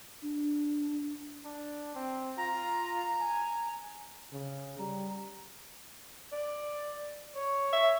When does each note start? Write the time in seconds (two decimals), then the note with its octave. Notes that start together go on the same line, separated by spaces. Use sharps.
0.22 D4
1.45 D4
1.95 C4
2.38 F4 A#5
3.20 G#5
4.32 C#3
4.79 G3 A#5
6.32 D5
7.36 C#5
7.73 E5